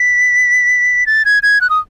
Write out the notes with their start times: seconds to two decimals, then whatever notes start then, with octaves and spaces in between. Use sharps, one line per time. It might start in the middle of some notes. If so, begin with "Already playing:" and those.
Already playing: B6
1.07 A6
1.25 G#6
1.43 G#6
1.61 F#6
1.70 D#6